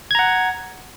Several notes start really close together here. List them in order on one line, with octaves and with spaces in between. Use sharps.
G#6 A#5 F#5